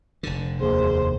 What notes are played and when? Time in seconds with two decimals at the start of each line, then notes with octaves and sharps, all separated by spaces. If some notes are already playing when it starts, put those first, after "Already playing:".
0.23 F1 D3
0.60 D#2 G#4 C5